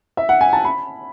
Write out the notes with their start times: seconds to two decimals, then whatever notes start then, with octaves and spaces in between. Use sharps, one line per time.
0.17 E5
0.29 F#5
0.41 G#5
0.53 A5
0.65 B5